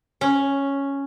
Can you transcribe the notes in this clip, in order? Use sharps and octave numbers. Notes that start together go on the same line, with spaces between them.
C#4